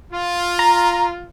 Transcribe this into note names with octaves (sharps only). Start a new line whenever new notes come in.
F4
A#5